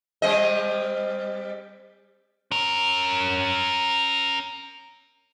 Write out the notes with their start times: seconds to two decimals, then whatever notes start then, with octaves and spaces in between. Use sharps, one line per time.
0.22 G3 C4 D#5
2.51 C#4 A#4